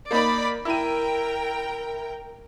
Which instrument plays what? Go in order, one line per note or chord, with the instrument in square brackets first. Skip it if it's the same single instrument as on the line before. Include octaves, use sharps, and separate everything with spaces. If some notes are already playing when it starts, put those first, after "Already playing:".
[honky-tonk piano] A#3 D#4 [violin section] D5 B5
[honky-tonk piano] E4 D#7 [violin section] A#4 G5